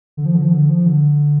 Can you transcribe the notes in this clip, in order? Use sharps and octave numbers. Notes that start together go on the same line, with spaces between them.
D3
F3
D3
F3
D3
F3
D3